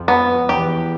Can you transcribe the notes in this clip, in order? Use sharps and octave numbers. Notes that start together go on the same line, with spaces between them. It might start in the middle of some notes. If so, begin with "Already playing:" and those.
Already playing: F2 F3
B3
E2 E3 G4